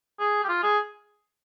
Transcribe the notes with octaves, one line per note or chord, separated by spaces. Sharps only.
G#4
G4
F4
G#4